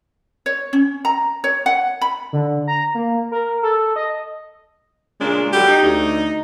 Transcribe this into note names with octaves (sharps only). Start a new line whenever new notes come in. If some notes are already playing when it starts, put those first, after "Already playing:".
C#5
C#4
A#5
C#5
F#5
B5
D3
A#5
A#3
A#4
A4
D#5
A#2 C#3 G#3 D4
B2 D3 F#3 G4
D#4
D2